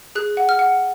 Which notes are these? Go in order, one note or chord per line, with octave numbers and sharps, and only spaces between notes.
G#4 F#6
F#5
F6
F#5